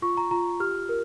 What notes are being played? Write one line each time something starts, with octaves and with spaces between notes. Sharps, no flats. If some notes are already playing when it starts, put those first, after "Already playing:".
F4 C#6
A#5
F4 A#5
G4 F6
A#4